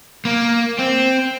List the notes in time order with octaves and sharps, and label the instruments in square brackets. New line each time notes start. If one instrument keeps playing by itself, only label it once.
[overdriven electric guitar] A#3
C4